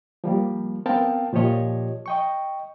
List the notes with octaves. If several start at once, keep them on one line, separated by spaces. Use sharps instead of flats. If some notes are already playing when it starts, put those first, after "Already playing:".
F3 G3 A#3
B3 C4 A#4 F5 G5 A5
A#2 F3 F4 G4 C#5 D#5
D#5 G5 C#6